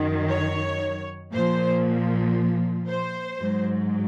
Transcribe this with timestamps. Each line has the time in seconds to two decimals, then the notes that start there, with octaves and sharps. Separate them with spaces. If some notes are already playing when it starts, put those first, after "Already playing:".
Already playing: F#2 D#3 F#3
0.29 C#5
1.32 A#2 F3 C5
2.88 C5
3.39 G#2 F#3